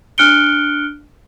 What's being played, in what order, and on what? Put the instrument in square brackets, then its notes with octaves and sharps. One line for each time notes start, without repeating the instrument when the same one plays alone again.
[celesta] D4 F6 F#6 C#7 D7 G7